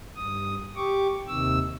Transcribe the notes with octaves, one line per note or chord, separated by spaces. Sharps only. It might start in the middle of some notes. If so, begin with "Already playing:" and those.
G2 D#6
G4 C#6 D6
D#2 C3 D#3 E6